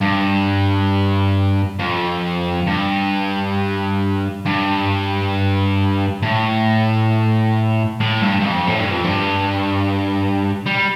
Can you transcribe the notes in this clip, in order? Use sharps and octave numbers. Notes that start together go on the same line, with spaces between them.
G2
F2
G2
G2
A2
A2
G2
G2
F2
A2
G2
F2
G2
G3